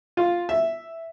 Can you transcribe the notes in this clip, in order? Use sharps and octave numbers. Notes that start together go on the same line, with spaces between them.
F4
E5